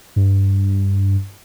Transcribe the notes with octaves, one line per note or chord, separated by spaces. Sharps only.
G2